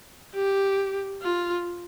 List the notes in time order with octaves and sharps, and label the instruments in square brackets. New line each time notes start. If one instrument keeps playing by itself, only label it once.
[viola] G4
F4